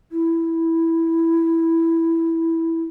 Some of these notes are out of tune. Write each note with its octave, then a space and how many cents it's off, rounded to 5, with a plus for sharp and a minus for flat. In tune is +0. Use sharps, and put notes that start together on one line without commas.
E4 +0